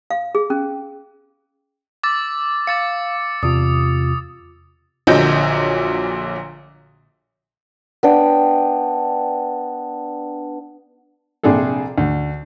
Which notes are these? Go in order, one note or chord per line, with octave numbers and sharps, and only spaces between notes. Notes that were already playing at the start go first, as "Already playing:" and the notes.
F5
G#4
C#4
D6 E6 A6
F5 D6 A6 C#7
E2 C3 F4 D#6
A#1 A#2 D3 F#3 D#5 G6
B3 D4 G5
A#1 C3 D4 G#4 A4
D2